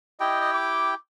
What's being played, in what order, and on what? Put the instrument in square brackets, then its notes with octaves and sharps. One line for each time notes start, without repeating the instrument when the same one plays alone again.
[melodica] E4 G4 G5 [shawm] D#5
[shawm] D#5
D6